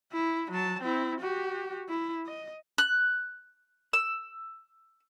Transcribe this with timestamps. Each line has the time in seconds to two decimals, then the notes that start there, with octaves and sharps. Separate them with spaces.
0.13 E4
0.51 F#3 A5
0.82 C4 E4
1.20 F#4 G4
1.89 E4
2.26 D#5
2.78 F#6
3.93 E6